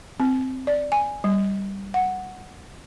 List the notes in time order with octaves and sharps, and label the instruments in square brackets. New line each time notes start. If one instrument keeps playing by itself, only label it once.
[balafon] C4
D5
G#5
G3
F#5